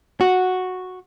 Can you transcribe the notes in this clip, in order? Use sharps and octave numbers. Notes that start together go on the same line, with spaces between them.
F#4